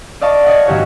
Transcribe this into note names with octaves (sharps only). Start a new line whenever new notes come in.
D5 D#5 F5 A5 C#6 D6
C#5 D#5 F5 F#5
G#1 F#3 F#4 G4 C#5 G#5